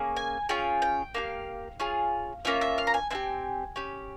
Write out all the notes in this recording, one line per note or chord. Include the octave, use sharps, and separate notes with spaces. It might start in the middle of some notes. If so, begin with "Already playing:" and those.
Already playing: A#3 C#4 G#4
G#5
C#4 F4 G#4 G5
G5
A#3 E4 G4 F5
C#4 F4 G#4
A#3 C#4 F4 E5
E5
F5
A#5
G#5
C4 E4 G4 G#5
C#4 G4